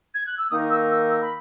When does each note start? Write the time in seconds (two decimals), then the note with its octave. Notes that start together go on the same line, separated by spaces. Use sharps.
0.14 G#6
0.26 F#6
0.38 E6
0.50 D#3 A#3 D#4 A#4 D#6
0.70 E6
0.90 E6
1.10 E6
1.21 B5